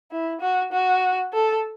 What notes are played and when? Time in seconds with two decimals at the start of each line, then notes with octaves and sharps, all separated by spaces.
0.11 E4
0.41 F#4
0.72 F#4
1.33 A4